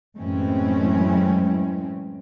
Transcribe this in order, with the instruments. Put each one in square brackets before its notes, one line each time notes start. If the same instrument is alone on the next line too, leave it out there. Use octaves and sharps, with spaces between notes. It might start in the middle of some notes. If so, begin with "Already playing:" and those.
[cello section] F#2 A2 E3 G#3 C4 C#4